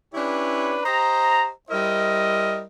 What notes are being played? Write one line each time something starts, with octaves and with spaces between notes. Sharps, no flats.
C#4 D4 E4 G4 B4 C#5
G4 C5 D#5 A#5
G3 E4 A#4 C5 D#5